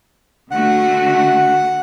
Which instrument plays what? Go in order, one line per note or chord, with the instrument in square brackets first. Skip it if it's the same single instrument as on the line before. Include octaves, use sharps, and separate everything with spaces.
[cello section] D3 A3 F#4 [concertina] F#5